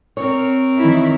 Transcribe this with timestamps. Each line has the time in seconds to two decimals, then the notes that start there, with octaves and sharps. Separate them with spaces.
0.17 C4 A#4 C#5
0.79 D#3 E3 E4